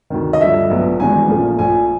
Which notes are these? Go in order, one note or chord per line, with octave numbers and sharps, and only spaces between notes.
D2 C3 D#3
D#5
G2 D3 F3 E5
A#1 A2 F#3 B3
G#1 G#2 E3 G3 B3 G#5
A#1 A#2 F3 A3 C#4
A#1 A2 F3 G#5